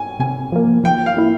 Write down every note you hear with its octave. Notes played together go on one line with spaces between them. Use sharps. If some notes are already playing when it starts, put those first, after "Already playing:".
Already playing: G#5
C3 G#5
F3 A#3
F3 G5
F5
A#3 E4